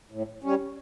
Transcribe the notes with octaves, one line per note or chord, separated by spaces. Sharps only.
A2
G3 C#4